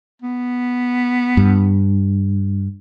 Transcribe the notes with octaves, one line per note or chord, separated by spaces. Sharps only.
B3
G2